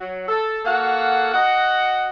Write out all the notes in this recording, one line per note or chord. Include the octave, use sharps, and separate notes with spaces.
F#3 F#4
A4
A#3 F#4 A4 F5 F#5
F#4 D#5 F#5